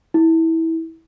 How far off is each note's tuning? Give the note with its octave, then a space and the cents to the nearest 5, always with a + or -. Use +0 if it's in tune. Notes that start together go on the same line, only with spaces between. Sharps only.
E4 -20